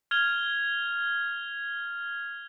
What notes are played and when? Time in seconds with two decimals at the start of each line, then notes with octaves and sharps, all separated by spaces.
0.11 F6 G#6 F7 G7